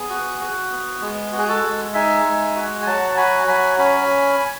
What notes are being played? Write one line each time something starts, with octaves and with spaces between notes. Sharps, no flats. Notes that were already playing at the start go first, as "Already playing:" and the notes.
Already playing: B3 G#4
F#4
F#4
B3
G#3
F#4
G#4
F#4 A4
G#3
D#4 E5 G#5
G#3
F#4
G#5
F#3 F#5 A5
A5
F#4 G#5 B5
F#3 G#5 B5
C#4 G#5 B5